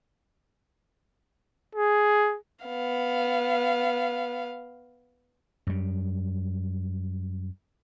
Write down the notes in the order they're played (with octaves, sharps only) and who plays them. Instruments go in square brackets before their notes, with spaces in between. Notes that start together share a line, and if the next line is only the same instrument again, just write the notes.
[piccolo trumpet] G#4
[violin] B3 F5
[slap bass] F#2 G3